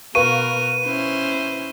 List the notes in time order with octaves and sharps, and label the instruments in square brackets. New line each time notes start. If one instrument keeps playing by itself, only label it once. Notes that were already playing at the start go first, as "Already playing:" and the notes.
[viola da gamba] B2 A#4 [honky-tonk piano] B4 F5 C#6 [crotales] D#7
[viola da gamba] C#4 E4 C5